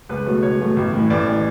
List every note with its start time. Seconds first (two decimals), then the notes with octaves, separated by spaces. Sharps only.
0.09 C#2 B4
0.26 B2 F#3 A3
0.43 C#2 C#5
0.60 B2 F#3 A3
0.77 A1
0.93 A2 E3
1.10 A1 D5
1.27 A2 E3